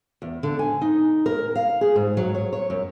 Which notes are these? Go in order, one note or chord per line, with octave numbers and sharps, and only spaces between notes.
E2
D3
G#5
D#4
A#4
F5
G#4
G#2
F#3
C#5
C#5
F#2